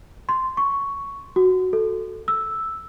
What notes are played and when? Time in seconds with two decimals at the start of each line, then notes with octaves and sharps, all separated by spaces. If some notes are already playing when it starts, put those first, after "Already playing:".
0.29 C6
0.57 C#6
1.36 F#4
1.73 A4
2.28 E6